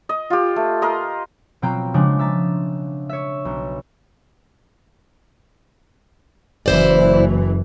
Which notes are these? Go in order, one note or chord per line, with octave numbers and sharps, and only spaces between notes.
D#5
F4 G4
A3
A#4 D#5 C6
B2 F#3 C4 F4 G5 A#5
C#3 F3 G#3 D4
E5 A#5 A6
C#5 E5
B1
F#1 E3 E4 C5 D5